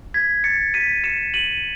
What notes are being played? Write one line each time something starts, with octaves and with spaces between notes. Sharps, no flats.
G#6 B6
A6 C#7
B6 D#7
C#7 E7
D#7 F#7